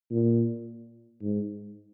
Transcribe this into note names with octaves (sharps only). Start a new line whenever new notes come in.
A#2
G#2